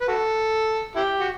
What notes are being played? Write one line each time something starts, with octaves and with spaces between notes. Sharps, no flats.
B4
F#4 A4
E4 G4
F#4